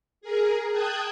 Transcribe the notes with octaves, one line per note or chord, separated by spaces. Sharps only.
G#4 A#4
G5 A5 D#6 F#6 G#6